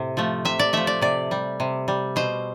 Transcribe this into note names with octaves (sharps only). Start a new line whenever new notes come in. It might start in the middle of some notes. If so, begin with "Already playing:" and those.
Already playing: A2 C3
F3 A3
C3 E5
D5
F3 A3 E5
D5
C3 D5
G3
C3
G3
B2 C5